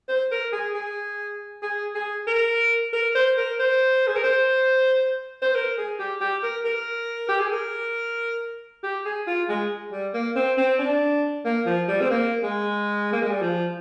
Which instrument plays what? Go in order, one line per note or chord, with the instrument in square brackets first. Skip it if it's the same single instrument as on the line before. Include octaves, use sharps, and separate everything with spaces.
[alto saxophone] C5
A#4
G#4
G#4
G#4
G#4
A#4
A#4
C5
A#4
C5
G#4
A#4
C5
C5
A#4
G#4
G4
G4
A#4
A#4
G4
G#4
A#4
G4
G#4
F4
G#3
G3
A#3
C4
C4
D4
A#3
F3
G3
C4
A#3
G#3
A#3
G#3
G3
F3